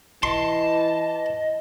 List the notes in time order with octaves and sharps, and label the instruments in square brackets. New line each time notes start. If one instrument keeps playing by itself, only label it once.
[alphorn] E3 [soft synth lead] D#5 [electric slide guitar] A5 [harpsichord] C6